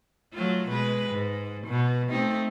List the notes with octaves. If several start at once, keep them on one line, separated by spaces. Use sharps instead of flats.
F#3 A3 F4
B2 G#3 B4
G#2
B2
A3 C4 D#4